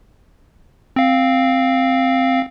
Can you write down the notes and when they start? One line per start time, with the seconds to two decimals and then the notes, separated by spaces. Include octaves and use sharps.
0.96 C4 F5